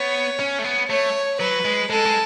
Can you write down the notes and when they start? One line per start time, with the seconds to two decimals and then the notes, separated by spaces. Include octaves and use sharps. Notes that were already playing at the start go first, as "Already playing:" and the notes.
Already playing: B3 C#5
0.39 C#4
0.59 A3
0.64 B3
0.89 A3 C#5
1.40 F#3 B4
1.65 G#3
1.90 G#3 A4
2.06 G#3